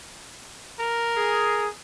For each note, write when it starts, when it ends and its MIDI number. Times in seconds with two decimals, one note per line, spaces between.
0.80 1.68 70
1.16 1.68 68